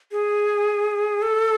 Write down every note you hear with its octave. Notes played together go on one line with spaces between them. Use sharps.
G#4
A4